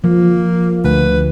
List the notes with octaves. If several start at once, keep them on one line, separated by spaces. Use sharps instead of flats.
F3 A#3
D2 B4